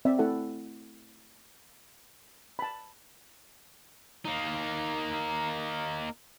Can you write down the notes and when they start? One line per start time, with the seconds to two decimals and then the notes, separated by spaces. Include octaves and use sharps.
0.05 C4 D5 E5
0.19 A3 E4 A4 F#5
2.59 A5 B5
4.25 A#3 D#4